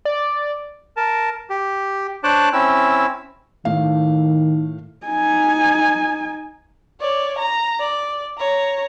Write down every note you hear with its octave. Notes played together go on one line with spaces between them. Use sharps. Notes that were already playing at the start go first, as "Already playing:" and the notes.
D5
A#4 A5
G4
D4 C5 C#5 A5 D6 F#6
C4 C#4 E4 E6
A2 D#3 A3 F5
D#4 G#5
C#5 D5
A#5
D5
C#5 A#5